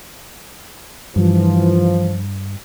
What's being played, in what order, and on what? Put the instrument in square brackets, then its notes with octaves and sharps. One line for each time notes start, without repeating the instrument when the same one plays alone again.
[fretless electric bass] G2 [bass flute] E3 [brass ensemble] F3